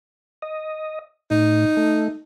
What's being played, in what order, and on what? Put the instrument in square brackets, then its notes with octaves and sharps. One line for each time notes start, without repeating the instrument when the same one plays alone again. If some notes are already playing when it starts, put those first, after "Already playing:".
[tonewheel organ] D#5
[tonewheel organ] A2 [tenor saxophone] D#4
[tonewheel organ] A3